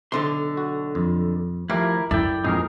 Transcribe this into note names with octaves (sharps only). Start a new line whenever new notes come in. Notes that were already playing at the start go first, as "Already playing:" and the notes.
B1 D3 C6
F#4
F2
F3 A3 E4 G4 A#4 F5
F#2 E4 A4 D5 G5
A#1 F2 G#2 D#4 G#4 A#4